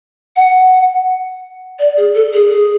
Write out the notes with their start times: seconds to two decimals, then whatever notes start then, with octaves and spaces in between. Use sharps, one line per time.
0.36 F#5
1.79 D5
1.97 G#4
2.15 A4
2.33 G#4
2.50 G#4